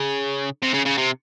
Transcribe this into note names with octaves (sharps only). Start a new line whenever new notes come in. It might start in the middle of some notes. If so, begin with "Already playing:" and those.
Already playing: C#3
C3
C#3
C#3
C3